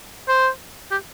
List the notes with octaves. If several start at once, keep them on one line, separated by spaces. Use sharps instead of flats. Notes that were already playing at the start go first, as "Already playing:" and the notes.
C5
G4